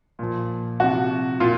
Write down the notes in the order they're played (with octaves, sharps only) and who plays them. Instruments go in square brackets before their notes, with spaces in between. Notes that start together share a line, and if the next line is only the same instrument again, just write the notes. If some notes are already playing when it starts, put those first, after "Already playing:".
[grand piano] A#2 F3
C3 F3 F#4
A#2 F4